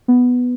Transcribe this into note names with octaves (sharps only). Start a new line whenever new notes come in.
B3